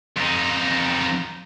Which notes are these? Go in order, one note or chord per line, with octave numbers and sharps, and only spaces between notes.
F2 D#4